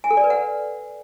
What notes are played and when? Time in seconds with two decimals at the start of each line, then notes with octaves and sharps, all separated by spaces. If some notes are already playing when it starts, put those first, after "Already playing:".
0.04 G#5
0.11 A4
0.17 D5
0.24 B4
0.30 F#5